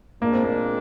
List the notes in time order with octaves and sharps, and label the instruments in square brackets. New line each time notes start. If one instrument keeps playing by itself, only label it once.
[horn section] A#2 G#3 D4 [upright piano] A#3
[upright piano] C4
A#3